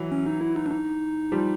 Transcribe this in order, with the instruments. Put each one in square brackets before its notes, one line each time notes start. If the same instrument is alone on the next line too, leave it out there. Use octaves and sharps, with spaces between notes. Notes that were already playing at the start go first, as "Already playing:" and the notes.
Already playing: [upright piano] E3 F#3
[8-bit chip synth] C#4
D#4
E4
D#4
D4
D#4
[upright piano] F3 G3